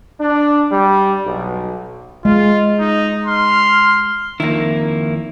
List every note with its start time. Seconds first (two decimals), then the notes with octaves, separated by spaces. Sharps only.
0.20 D4
0.71 G3
1.25 B1
2.25 G#3 F4
2.79 D#4
3.27 C6 F6
4.40 F2 D#3 A#3 E4